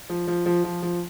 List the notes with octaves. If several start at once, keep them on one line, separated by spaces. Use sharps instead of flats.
F3
F3
F3
F3
F3